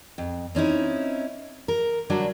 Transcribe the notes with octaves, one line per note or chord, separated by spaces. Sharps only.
F2
C4 C#4 D#4 E4
A#4
D3 F#3 G3 D4